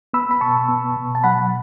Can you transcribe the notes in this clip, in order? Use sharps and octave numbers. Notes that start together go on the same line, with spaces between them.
B3 B5 E6
B5
B2 A5 C#6
B3
B2
A5
F#3 F#5 B5